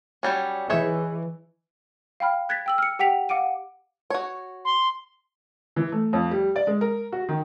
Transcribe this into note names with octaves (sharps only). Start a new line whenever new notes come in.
F#3 G3 C#4
E3 D#4 G#4 C#5 E5
F5 G5 B5 F6
F#6 G#6 A6 B6
G5 E6 F#7
F6 C#7
G4 F#5 G5 B6 F7
F5 F#5 D6 D7 D#7
F#4 C#5
C6
E3
A3
F2
G3
D5
G#3
A#4
F#4
D#3